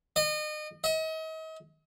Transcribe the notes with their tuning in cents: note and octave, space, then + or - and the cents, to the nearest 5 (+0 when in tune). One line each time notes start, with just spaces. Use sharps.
D#5 -35
D#5 +40